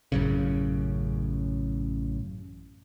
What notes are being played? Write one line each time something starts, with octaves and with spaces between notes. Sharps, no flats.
A1 F#2 C#3